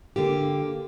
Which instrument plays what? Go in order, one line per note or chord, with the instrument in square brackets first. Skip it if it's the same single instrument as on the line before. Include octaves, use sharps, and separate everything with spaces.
[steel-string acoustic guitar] D3 A#3 G4